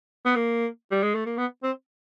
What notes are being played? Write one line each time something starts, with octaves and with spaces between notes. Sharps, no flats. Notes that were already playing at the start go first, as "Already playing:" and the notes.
B3
A#3
G3
G#3
A3
A#3
B3
C4